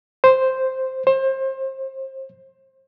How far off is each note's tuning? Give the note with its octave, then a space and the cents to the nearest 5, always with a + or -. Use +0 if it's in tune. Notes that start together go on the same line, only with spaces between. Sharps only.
C5 +0
C5 +30